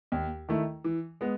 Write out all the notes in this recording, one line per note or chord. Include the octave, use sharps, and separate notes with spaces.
D#2
D#3 A3 E4
E3
G#3 B3